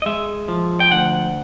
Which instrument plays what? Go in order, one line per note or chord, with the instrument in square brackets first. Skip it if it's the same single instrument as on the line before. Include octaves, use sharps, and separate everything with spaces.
[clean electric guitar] D#5
G#3 E5
F3
G5
D2 F#5